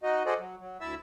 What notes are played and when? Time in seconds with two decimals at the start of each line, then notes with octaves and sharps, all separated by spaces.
0.03 D#4 F#4 D#5
0.26 F#4 G#4 A4 C5 D5 D#5
0.39 F#3
0.60 F#3
0.81 D2 E4 E5 A5 E6